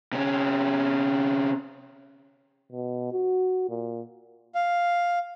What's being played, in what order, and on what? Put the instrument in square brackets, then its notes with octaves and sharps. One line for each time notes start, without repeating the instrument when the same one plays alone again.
[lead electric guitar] C3 C#4
[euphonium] B2
F#4
A#2
[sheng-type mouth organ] F5